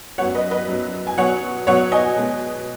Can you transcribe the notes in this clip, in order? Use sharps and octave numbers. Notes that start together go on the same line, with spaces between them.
F#2 F#3 B3 C#5 F#5
B4 D#5
B4 D#5
F#2 F#3 B3
G#5
B2 F#3 B3 C#5 F#5
B2 F#3 B3 C#5 F#5
D#5 G#5
B2 G#3 B3